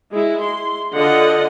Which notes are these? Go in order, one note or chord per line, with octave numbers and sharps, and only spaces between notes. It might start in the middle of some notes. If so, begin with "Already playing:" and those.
G#3 E4
C6
D3 F4 D#5 F#5